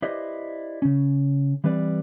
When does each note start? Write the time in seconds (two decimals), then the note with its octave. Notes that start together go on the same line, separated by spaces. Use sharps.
0.02 E4 G4 B4 C5 D5 D#5
0.82 C#3 C#4
1.64 E3 G3 C4 B4 D5